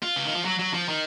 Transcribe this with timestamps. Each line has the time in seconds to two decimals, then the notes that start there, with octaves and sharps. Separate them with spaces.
0.03 F4
0.16 C#3
0.25 D#3
0.35 F3
0.45 F#3
0.59 F#3
0.73 F3
0.89 D#3